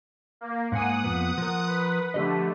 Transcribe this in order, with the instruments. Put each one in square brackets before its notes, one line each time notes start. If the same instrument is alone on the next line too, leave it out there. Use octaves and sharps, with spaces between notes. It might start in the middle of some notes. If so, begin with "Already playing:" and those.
[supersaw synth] A#3
[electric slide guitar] G#2 A#3 G#5 [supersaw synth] F#5 D#6
[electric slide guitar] F2 F3 B3
F3 A#4
[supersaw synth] B4
[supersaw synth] D3 A3 [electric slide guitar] F3 G4 D#5